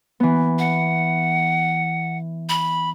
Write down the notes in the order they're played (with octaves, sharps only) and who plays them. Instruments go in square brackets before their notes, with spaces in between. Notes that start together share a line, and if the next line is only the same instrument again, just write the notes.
[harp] E3 B3
[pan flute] F#5
B5